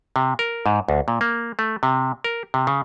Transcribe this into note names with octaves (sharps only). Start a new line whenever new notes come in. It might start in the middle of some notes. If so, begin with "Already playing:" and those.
C3
A#4
G#2
D2
A#2
A#3
A3
C3
A#4
C3
C#3